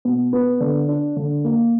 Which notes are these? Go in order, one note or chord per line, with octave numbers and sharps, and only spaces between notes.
B2
B3
D3
D4
D3
A#3